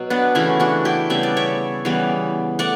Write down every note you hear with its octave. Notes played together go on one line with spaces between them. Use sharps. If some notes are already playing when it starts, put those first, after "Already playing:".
Already playing: B2 F#3
B3 D4
C#3 E3 A3 C#4 E4
D4 F#4
E4 G4
C#3 G3 B3 E5
D5
C#5 E5
C#3 E3 G3 B3
A3 D5 F#5